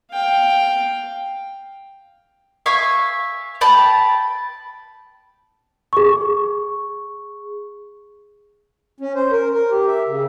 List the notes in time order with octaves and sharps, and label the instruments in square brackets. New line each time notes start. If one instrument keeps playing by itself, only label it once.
[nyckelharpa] F5 G5
[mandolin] E5 F5 G#5 C#6
G5 A5 B5
[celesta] G#4 C#6
[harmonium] C#4
C5
A#4
A#4
G4
E5
C#3